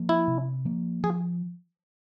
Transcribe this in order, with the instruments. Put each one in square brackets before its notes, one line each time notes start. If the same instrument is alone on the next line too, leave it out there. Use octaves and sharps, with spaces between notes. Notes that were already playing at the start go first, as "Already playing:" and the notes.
Already playing: [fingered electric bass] F3 A#3
[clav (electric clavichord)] E4
[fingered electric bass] C3
F3 A#3
[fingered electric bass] F3 [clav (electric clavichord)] G#4